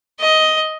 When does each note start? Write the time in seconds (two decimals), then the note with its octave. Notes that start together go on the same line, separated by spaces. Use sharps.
0.20 D#5